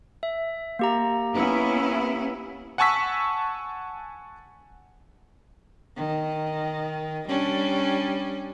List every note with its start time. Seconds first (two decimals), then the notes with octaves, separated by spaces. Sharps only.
0.23 E5
0.79 A#3 G4 A#5
1.36 B3 C#4 E4
2.78 F#5 G#5 A5 C#6 E6 B6
5.97 D#3
7.28 G3 C#4 D4